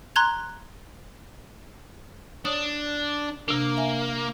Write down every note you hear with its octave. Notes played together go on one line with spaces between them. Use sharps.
A#5 C6 F#6 G#6 F7
D4 C#5 D#6
C3 A#3 D4
E5 G#5